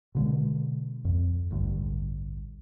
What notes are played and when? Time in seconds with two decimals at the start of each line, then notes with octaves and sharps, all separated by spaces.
0.15 B2 D3 G#3
1.05 F2
1.51 A1 D2 G2